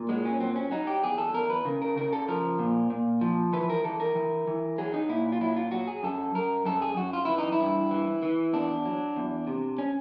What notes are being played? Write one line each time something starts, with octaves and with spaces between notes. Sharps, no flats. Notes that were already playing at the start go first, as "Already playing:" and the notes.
Already playing: A#2
F#3 G#3
C#4
F#3 C4
C#4
F#3 D#4
G4
E2 G#4
A4
E2 A#4
B4
C#3 A#4
A#4
C#3 A#4
A4
F3 A#4
A#2
A#2
F3
E3 B4
A#4
E3 A4
A#4
E3
E3
F#3 G#4
D#4
A#2 E4
F4
F#3 E4
F4
F#3 F#4
G#4
F#2 A4
F#2 A#4
F#2 A4
G#4
F#2 F#4
F4
E3 E4
D#4
E4
G2
E3
E3
E2 D4
F#3
E2
C3
C#4